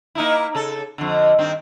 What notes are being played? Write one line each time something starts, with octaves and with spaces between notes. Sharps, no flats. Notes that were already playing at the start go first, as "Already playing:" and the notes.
A#3 D#4 E4
C#3 A4
F2 D3
G2 D#3 C4